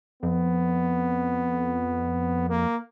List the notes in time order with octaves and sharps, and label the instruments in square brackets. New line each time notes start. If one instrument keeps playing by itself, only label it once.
[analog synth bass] F2 [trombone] B3
[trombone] A#3